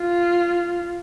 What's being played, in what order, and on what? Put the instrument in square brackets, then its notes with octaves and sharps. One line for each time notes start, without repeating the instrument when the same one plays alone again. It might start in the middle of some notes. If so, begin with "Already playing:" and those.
Already playing: [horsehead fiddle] F4